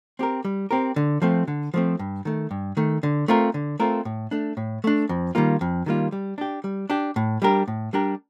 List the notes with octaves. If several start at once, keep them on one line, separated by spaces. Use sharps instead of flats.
C4 G4 A#4
G3
C4 G4 A#4
D3
F3 A3 C4
D3
F3 A3 C4
G2
D#3 A3
G2
D#3 A3
D3
A3 C4 F4 A#4
D3
A3 C4 F4 A#4
A2
A3 D4
A2
A3 D4
F2
D#3 G3 A#3 F4
F2
D#3 G3 A#3 F4
G3
D4 G4
G3
D4 G4
A2
G3 D4 G4 A#4
A2
G3 D4 G4 A#4